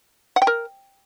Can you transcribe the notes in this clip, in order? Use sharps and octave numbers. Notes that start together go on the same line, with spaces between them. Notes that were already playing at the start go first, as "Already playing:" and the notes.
F#5
G5
A#4